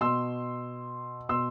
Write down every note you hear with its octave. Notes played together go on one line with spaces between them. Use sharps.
B2 C6 E6
B2 C6 E6